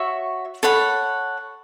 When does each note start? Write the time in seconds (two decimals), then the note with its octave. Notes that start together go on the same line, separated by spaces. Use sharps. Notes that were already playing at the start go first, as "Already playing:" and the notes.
Already playing: F#4 C#5 E5
0.63 A4 C#5 F#5 B5